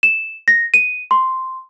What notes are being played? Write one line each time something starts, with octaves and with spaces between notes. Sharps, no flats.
E7
A#6
D#7
C6